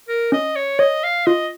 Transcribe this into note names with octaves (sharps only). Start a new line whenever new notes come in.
A#4
C#4 D#5
C#5
C#5 D#5
F5
F4 D#5